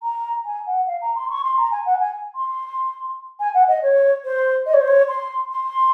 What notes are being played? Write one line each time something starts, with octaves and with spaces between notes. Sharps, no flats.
A#5
G#5
F#5
F5
A#5
C6
C#6
C6
A#5
G#5
F#5
G#5
C6
G#5
F#5
D#5
C#5
C5
D#5
C#5
C5
C#5
C6
C6